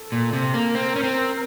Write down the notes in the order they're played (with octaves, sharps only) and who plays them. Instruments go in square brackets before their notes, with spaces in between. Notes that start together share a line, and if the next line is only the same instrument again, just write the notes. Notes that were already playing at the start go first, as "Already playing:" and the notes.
Already playing: [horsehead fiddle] A4
[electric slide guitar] A#2
C3
A#3
[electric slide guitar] C4 [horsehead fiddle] A#4
[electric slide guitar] C#4
C4